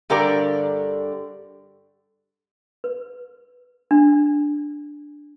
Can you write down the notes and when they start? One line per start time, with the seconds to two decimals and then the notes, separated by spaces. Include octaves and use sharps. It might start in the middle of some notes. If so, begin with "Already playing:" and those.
0.10 G2 D3 G4 A#4 D5
2.84 B4
3.91 D4